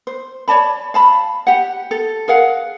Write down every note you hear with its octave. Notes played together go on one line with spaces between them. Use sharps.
C5
C#5 D5 A5 B5
F5 A5 B5
G4 F#5
A4
G#4 A#4 F5 F#5